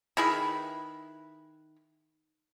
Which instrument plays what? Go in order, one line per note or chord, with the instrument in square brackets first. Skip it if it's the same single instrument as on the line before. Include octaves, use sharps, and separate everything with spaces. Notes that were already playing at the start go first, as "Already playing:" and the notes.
[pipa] D#3 E4 G#4 B4